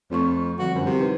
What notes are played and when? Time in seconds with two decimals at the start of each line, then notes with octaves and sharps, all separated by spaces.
0.11 F2 F3 A3 C#6
0.59 D3 F3 G3 F#4
0.74 F#2 D3 C5
0.86 C3 E4 A#4
0.99 D#4 B4 C5